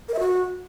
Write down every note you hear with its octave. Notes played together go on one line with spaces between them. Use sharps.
A#4
E5
F#4